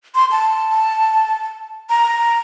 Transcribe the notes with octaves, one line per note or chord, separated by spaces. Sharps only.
C6
A5
A#5